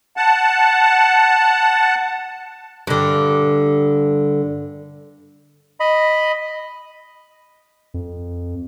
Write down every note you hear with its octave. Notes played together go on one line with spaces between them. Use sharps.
F#5 A5
G2 D3
D#5 B5
F2